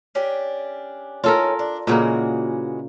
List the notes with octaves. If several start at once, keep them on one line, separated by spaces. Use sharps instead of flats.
C#4 D4 G4
D#3 C#4 F4 A4 A#4
D4
A#2 C#3 E3 G#3 A#3 F#4